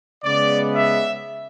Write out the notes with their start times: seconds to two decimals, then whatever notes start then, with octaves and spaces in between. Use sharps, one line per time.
0.24 C#3 G#3 B3 D5
0.75 E5